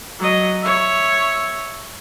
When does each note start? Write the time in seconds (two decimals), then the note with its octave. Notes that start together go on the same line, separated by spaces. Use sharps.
0.20 F#3 D#5
0.61 C#5 E5